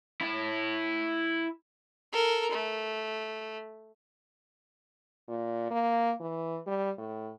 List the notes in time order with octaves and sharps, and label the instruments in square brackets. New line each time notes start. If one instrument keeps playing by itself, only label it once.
[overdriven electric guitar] E4 A5
[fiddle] A4 A#4
A3
[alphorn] A#2
A#3
E3
G3
A2